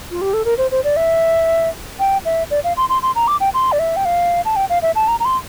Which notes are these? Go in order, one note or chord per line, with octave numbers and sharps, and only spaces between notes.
F4
G4
A4
A#4
C5
C5
D5
E5
G5
E5
D5
F5
C6
C6
C6
A#5
D6
G5
C6
D5
E5
G5
F5
A5
G5
F5
E5
A5
A#5
A#5
C6